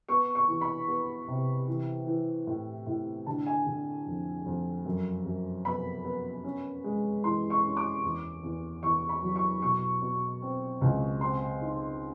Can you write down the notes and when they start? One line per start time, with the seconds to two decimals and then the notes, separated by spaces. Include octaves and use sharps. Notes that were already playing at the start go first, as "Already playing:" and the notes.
0.09 B3 C#6
0.35 C#6
0.48 E3
0.61 B5
0.88 B3
1.28 C3
1.67 E3
2.07 E3
2.47 A2
2.87 A2
3.26 D3 A5
3.46 G#5
3.66 D3
4.06 F2
4.46 F2
4.85 F#2
5.25 F#2
5.65 B3 B5
6.05 B3
6.44 C#4
6.84 G#3
7.24 E3 C6
7.50 C#6
7.63 C#4
7.77 D6
8.03 E2
8.43 E2
8.83 E2 C#6
9.09 B5
9.22 F#3
9.36 C#6
9.62 B2 C#6
10.02 B2
10.42 C4
10.81 C#2
11.21 C4 C6
11.61 D#4